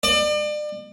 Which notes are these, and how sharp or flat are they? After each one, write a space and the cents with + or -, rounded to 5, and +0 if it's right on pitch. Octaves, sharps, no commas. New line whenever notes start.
D5 +35